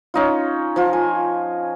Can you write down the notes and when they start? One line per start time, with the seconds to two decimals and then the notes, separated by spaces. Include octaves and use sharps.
0.14 C#4 D#4 F4
0.76 F3 F4
0.93 G#5